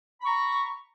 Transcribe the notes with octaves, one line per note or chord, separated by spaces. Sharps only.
A#5 B5 C#6